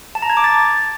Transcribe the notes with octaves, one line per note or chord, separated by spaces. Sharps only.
A5
A#5
G#6
D6
A6